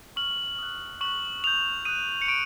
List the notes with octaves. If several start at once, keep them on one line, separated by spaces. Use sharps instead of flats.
C#6 F6 F#7
D#6 F#6
C#6 F#6 F#7
D#6 G6 F7
D#6 F#6 D#7
C#7
C#6 D7